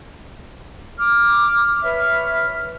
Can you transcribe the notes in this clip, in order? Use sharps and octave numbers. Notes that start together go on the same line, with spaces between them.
D6 F6
B4 C#5 E5 F6